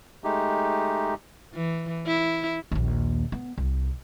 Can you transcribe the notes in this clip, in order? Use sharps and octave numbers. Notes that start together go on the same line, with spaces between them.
G#3 A3 D#4 G4
E3
E4
A#1 D#2
B3
C2